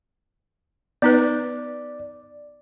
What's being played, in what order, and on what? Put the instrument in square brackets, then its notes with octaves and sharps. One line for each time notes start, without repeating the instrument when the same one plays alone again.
[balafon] B3 D#4 B4 [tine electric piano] D5